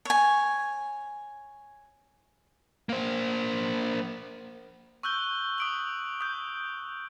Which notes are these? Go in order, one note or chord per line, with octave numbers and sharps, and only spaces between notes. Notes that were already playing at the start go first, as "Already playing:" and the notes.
C#5 G#5
A#3 C5
C#6 E6 F#6 G6 G7
D#6 D7 F#7
D#6 G6